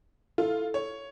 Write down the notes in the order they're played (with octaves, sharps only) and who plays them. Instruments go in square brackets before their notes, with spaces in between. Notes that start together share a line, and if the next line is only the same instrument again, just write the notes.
[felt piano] E4 A4 [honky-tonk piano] F4
[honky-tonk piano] C#5